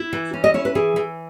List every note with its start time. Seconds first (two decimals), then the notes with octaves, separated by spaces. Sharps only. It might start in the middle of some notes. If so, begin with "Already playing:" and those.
Already playing: E4
0.13 E3
0.33 C#4
0.44 D#5
0.54 E4 C#5
0.65 B4
0.75 E3 G#4
0.96 E3